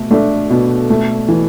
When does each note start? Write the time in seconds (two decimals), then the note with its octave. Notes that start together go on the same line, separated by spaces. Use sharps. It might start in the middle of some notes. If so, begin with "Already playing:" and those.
Already playing: B2 A3
0.11 A3 D4
0.50 B2
0.90 A3
1.28 E3